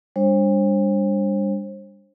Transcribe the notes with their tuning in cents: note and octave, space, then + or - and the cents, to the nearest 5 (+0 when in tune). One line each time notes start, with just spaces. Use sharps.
G3 +40 D4 +0 C5 +35